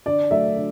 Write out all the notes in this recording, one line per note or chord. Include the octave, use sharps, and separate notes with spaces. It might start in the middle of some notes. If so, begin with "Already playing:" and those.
D3 D5
F#3 A3 E5
D3